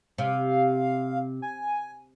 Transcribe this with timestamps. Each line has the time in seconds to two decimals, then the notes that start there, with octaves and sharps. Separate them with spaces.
0.18 C3 F5
1.42 G#5